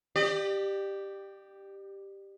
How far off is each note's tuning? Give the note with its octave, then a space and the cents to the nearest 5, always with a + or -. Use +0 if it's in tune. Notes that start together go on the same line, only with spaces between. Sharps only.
G4 +0 D5 +35